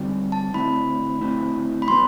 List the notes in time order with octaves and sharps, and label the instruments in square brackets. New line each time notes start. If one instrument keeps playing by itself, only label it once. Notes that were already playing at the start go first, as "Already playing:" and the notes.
Already playing: [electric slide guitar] D3 G3 C4 F#4
[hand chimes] A5
[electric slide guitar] D3 A3 C4 E4 [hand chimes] B5
[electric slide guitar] D3 A3 C4 E4
[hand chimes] B5
[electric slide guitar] F#3 B3 [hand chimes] C6